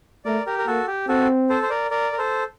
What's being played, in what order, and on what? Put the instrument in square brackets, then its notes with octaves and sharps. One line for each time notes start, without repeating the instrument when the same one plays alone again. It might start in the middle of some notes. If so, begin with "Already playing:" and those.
[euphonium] A3 [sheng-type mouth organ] A#4 D5
[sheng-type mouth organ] G4 A#4
A#4
[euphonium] A#3 [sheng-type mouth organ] F#4 A4
[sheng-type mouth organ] G4
[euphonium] C4 [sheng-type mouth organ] F#4 A4
[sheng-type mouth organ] A4 C5
C5
A#4 D5
A#4 D5
A#4
A4 C5